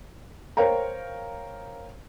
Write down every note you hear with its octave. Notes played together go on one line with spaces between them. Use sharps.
A#4 C5 C#5 F5 G5 A#5